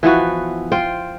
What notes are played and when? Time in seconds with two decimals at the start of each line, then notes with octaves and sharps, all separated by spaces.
0.03 E3 F3 B3 F#4
0.72 F4 C5 G5